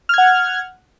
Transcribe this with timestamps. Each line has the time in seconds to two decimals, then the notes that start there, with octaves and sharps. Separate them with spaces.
0.09 F6
0.14 G#6
0.18 F#5